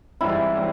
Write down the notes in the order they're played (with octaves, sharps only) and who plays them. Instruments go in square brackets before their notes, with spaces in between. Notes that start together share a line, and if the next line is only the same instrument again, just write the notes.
[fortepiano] G#2 E3 G3 C4 [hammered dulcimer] E4
[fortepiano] E3 G3 C4